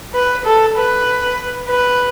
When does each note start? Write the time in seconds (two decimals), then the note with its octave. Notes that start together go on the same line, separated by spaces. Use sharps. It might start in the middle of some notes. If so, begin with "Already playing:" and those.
0.14 B4
0.45 A4
0.76 B4
1.68 B4